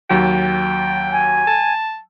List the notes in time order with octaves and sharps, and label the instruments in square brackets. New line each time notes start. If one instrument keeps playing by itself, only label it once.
[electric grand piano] D#2 F#3 [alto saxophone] G5
[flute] G#5
[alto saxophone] A5